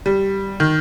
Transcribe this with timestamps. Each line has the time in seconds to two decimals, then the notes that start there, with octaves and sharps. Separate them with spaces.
0.06 G3
0.60 D#3